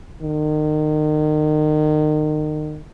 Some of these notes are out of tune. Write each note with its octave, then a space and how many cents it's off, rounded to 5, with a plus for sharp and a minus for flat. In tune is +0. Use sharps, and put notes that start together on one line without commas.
D#3 -30